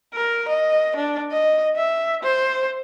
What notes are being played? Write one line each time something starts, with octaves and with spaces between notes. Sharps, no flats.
A#4
D#5
D4
D#5
E5
C5